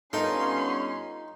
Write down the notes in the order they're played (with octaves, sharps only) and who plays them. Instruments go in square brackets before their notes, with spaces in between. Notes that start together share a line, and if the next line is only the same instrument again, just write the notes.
[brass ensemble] G2 B3 C#4 [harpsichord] D#4 [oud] F4 A4 A#4 [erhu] C6